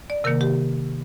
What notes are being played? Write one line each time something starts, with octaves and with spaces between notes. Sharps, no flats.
D5
C3 D#3 A#3 A#4
G4